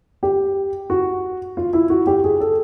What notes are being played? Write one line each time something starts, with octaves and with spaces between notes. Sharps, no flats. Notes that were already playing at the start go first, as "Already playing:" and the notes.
G4
F#4
F4
E4
F#4
G4
G#4
A4